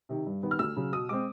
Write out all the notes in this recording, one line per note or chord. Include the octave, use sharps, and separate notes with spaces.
C3 D#3
G2
D#3 G3 B3
F6
D2 E6
C#3 F#3
B2 D#6
G#3 C4 D6